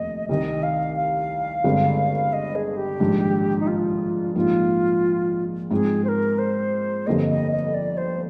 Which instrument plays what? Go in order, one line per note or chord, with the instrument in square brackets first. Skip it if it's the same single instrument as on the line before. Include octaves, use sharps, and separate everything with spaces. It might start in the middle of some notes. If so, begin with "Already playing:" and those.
Already playing: [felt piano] F1 D#2 [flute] D#5
[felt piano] C2 C3 D#3 [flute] D#5
[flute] F5
F5
[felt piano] G1 G2 D3 G#3 C4
[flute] D#5
G#4
G4
[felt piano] A#1 G#2 D#3 G3 D4
[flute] D#4
F4
[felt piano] A#1 G#2 G3 A#3 D#4 [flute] F4
[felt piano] G#2 F3 C4 D#4 [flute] G#4
[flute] C5
A#4
C5
[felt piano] G1 F2 D3 G3 A#3 [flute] D#5
[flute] D#5
D#5
D5
C5